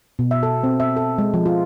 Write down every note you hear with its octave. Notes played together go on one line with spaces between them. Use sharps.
B2
E5
A4
C4
E5
A4
G#3
F3
F4